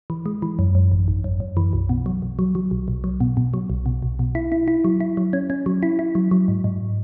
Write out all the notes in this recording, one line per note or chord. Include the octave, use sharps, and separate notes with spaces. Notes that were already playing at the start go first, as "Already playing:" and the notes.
E3
G#3
E3
F#2
F#2
G#1
G#1
F#2
F#2
E3
B1
B2
F#3
B1
F#3
F#3
B1
B1
F#3
B2
B2
F#3
B1
B2
B1
B2
E4
E4
E4
F#3
E4
F#3
C#4
C#4
F#3
E4
E4
F#3
F#3
G#2
G#2